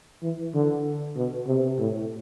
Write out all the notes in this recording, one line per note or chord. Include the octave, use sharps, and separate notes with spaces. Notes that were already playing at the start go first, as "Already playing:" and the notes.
E3
D3
B2
C3
A2